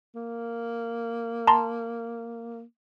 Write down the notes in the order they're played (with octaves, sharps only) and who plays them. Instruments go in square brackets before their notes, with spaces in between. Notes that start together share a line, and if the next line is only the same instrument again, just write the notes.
[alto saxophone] A#3
[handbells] A5 A#5 C6